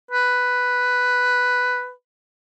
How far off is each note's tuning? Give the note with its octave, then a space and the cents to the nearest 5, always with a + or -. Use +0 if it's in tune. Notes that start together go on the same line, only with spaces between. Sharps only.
B4 +5